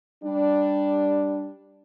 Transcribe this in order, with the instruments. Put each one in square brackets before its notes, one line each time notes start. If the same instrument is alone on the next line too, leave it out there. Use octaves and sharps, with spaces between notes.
[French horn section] G3 D4